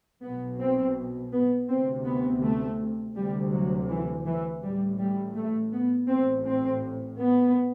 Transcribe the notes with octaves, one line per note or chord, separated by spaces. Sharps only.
B1 B2 B3
C4
B3
D2 C3 C4
B3
A3
D2 C3 G3
F#3
E3
E3
A1 A2 G3
G3
A3
B3
A1 A2 C4
C4
B3